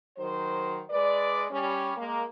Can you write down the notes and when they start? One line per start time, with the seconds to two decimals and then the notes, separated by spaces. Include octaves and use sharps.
0.18 D#3 F#3 C5
0.90 G#3 B4 D5
1.50 G3 C#4
1.97 G#3 A#3